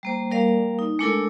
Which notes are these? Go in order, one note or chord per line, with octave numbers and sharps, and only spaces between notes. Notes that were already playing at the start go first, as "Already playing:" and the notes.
G3 A#3 C5
G3 A#3 A#4 D5 F5
D#4
G#3 A3 D4 E4 A4 A#4